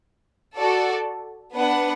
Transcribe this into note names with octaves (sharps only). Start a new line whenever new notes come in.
F#4 A4 D5
B3 D4 B4 F#5